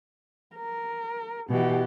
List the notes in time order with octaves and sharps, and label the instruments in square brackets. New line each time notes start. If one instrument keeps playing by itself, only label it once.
[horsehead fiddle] A#4
[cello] B2 E3 [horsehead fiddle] G4 F#5